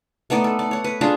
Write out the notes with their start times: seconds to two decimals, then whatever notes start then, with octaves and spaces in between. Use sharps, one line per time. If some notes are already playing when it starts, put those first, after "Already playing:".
0.30 A3 B3 D#4 D5
0.44 A4
0.59 D5
0.71 C#5 F#5
0.84 B4
1.01 D4 F4 G#4